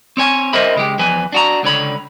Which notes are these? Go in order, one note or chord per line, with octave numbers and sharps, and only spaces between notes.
C4 C#5 G#5
A#4 C5 D#5 E5 B5
C#2 G#3 G4
E2 F3 B4 G#5
D4 F#4 A#5
C#2 D3 C#5 B5